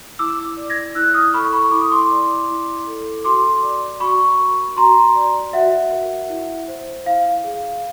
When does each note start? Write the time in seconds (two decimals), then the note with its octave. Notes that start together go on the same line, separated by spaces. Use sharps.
0.19 E4 D6 E6
0.57 D5
0.70 G#6 A#6
0.95 E4 E6 F#6
1.14 D#6 F6
1.34 A4 B5 C#6
1.53 B5 C#6
1.71 E4 D6
1.81 D#6
1.92 C6 D6
2.10 D5
2.48 E4
2.87 A4
3.24 F#4 C6 D6
3.63 D5
4.00 F#4 B5 C#6
4.39 A#4
4.77 F#4 A#5 C6
5.15 D5
5.53 F#4 E5 F#5
5.92 A#4
6.29 E4
6.68 C5
7.06 E4 F5
7.44 G#4